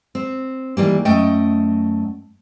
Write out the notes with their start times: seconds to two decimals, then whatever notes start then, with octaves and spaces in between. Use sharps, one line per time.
0.15 C4
0.77 D#3 E3 G3 A#3
1.05 F#2 A3 D#5 G5